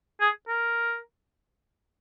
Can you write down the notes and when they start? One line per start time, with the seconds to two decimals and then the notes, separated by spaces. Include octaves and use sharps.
0.21 G#4
0.48 A#4